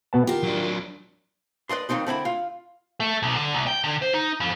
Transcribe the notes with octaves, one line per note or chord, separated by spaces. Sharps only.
B2 B3 A5
D#3 F4 G4
F#3 D4
B4 D5 D#5 C6
F2 D#3 C4 D#4 C6
D3 C4 E4 B5
F4
A3
B1
D3
C2
G5
D3
C5
D#4
F2